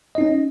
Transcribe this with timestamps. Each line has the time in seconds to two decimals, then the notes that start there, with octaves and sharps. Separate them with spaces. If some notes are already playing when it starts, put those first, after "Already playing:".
0.15 D#5
0.18 D#4
0.21 C#4